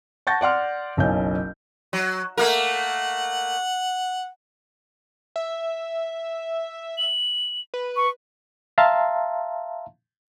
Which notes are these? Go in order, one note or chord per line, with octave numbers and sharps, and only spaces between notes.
F#5 A5 C#6 G6 A6 A#6
D5 F#5 C6 F6
F#1 B1 C#4 G6
F#3
A3 A#3 A#4 F#5
E5
F#7
B4
C#6
E5 F5 A5 A#5 C6